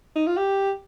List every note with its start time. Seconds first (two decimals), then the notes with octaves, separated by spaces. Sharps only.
0.16 D#4
0.27 F4
0.37 G4